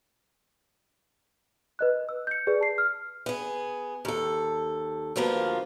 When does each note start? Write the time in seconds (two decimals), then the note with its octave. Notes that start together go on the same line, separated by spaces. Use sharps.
1.79 B4 D#5 F#6
2.09 E6
2.27 G6 C#7
2.47 G#4 B4 D5
2.61 A5 C7
2.78 F6
3.26 B3 G#4
4.05 D#2 A4
5.16 D2 G2 F3 A#3 B3 F4